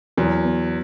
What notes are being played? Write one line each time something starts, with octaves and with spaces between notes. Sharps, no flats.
E2 F#3
B3